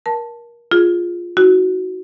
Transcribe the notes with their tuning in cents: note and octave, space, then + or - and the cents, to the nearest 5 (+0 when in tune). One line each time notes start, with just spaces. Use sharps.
A#4 +25 A5 +0
F4 +0 G#4 +0
D#4 +45 F#4 +0